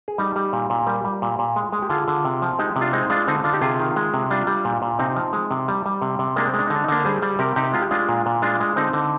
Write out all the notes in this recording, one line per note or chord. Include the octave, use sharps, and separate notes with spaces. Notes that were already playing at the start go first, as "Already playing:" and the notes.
G#4
G3 D#4 G4
G3
A#2
A#2
G3 G4 A#4
G3
A#2
A#2
G#3
G#3
G4
D3 F4 G#4
D3
C3
F3
G#3 D#4 G4
C3
D4 F4
G#3 C4 D#4
G#3 D4 F4
D3 C4 D#4
D3 D4 F4
D#4 G4
C3 F4 G#4
D#3
G#3
C3
G3 D4 F4
G3
A#2
A#2
C3 C4 D#4
F3
G#3
C3
G3
G3
C3
C3
G#3 A#3 D4
C4
G#3
D4
D3 D#4
D4
D#4
D3 A#3 D4
G3 G#4 C5
G3
C3 G4 A#4
C3 D#4 G4
G#3 F4
G4
G#3 D4 F4
A#2
A#2
G#3 D4 F4
G#3
D3 C4 D#4
D3